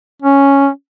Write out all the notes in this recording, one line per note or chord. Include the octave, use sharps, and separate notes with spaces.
C#4